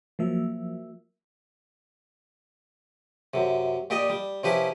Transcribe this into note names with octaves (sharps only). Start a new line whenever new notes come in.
F3 F#3 A#3 E5
F#2 C3
A#2 G4 D5 D#5
G3
C3 F3 C#4 E4 G4 B4